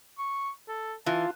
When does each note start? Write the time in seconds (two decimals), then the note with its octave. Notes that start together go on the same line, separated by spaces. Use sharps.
0.18 C#6
0.68 A4
1.06 E3 F4 A5